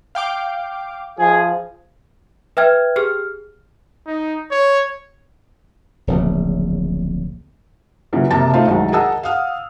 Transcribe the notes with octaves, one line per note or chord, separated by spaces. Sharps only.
F5 G5 D6
F3 G#4
B4 E5 G5 F6 G#6
G4 G#4 F6
D#4
C#5
D1 A#1 C#3
A#2 C#3 E3 F#3
F#1 C3 A#3 A5 A#5 A6
A3 D#4 F4 C5 F5 A5
C2 D#3 F#3 G#3 D#4
G#4 A#4 D#5 F#5 A5 E6
F5 F#5 D#6 F6